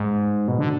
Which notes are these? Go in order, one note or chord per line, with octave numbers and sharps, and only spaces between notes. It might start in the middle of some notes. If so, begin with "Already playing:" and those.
Already playing: G#2
B2
D3